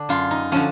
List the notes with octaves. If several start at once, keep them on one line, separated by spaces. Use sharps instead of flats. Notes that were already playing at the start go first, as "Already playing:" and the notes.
Already playing: D3 D4
F#2 F4
D#4
D3 F3 C#4